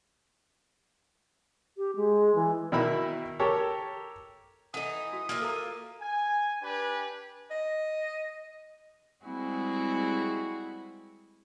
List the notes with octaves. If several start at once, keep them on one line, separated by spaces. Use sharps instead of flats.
G4
G#3
E3
B2 D#3 E4 A#4 E5 B5
G4 A4 A#4 C#5
E3 D#4 A4 F#5 D#6
F#4
A#3 F4 E5
A4 A#5
G#5
D4 G4 B4 G5 G#5
D#5
G3 G#3 C4 E4 F#4 G#4